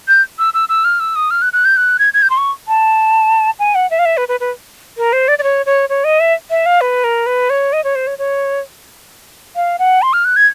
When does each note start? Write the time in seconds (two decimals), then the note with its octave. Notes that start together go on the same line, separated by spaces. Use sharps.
0.08 G6
0.39 E6
0.54 E6
0.69 E6
0.84 F6
1.00 E6
1.16 D#6
1.31 F6
1.42 F#6
1.53 F#6
1.65 G6
1.77 F#6
1.99 G#6
2.14 G#6
2.22 G6
2.30 C6
2.37 C#6
2.68 A5
3.59 G#5
3.75 F#5
3.91 E5
3.99 F5
4.05 E5
4.17 B4
4.28 B4
4.40 B4
4.97 A#4
5.13 C5
5.28 D5
5.39 D5
5.43 C#5
5.66 C#5
5.89 C#5
6.04 D#5
6.20 E5
6.50 E5
6.66 F5
6.81 B4
7.04 A#4
7.26 B4
7.50 C#5
7.73 D#5
7.84 C#5
7.95 C5
8.07 C#5
8.18 C#5
9.56 F5
9.79 F#5
10.02 C6
10.13 F6
10.25 F#6
10.36 G#6